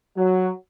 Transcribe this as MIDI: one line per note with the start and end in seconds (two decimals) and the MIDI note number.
0.16 0.49 54